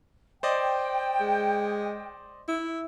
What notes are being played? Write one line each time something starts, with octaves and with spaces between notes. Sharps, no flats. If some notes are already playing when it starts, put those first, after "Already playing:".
C5 D5 D#5 G5
G#3
E4